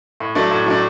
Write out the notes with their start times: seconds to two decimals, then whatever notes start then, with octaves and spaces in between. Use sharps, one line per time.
0.20 A2
0.35 F#3 A3 D4
0.51 A2
0.66 F#3 A3 D4